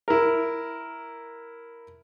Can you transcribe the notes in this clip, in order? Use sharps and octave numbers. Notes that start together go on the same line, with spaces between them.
E4 A#4